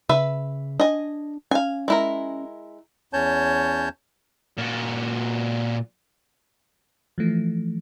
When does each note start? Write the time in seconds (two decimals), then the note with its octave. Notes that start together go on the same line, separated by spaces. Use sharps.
0.09 C#3 B4 E5
0.80 D4 D#5 G#5
1.51 C#4 F5 G#5
1.88 G#3 E4 A#4
3.13 E2 C#4 C#5 A5 G6
4.58 A#2 F#4
7.18 E3 F3 A3